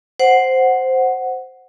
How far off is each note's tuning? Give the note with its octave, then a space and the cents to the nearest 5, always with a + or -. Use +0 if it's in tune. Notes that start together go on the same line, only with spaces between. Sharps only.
C5 +0 F#5 +0